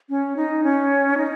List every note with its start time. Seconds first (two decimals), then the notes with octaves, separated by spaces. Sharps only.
0.09 C#4
0.36 D#4
0.64 C#4
1.17 D#4